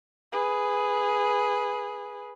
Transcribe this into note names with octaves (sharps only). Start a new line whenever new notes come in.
G#4 B4